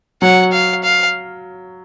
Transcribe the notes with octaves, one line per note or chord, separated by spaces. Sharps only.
F#3 F#5
F5
F5